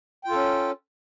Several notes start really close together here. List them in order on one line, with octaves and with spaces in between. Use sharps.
G5 F4 A4 C#4